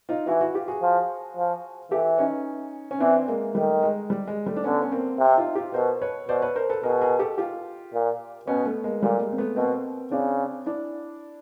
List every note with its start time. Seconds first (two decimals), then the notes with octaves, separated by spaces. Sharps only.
0.09 D#4 F4
0.27 E3 E4 F#4
0.41 E4 F#4
0.54 F4 G4
0.68 F#4 G#4
0.82 F3
1.37 F3
1.91 E3 G4 A4
2.18 C#4 D#4
2.91 C#4
3.00 E3 C4 D4
3.28 G#3 A#3
3.55 D#3 G3 A3
3.83 G#3
4.10 G3
4.28 G#3
4.46 G3 A3
4.56 D4
4.64 D3 B3 C#4
4.82 C#4
4.92 A#3 C4
5.19 C3
5.37 D#4 F4
5.55 F4 G4
5.74 B2 A#4 C5
6.02 B4 C#5
6.28 B2 C5 D5
6.42 B4 C#5
6.56 A#4 C5
6.69 A4 B4
6.83 B2 G#4 A#4
7.01 G#4 A#4
7.19 G4 A4
7.38 F4 G4
7.93 A#2
8.47 B2 B3 C#4
8.66 A3 B3
8.84 G#3 A#3
9.02 A#2 G3 A3
9.20 G#3 A#3
9.32 C4
9.38 A3 B3
9.56 B2 A#3 C4
10.11 C#3 C4 D4
10.66 D4 E4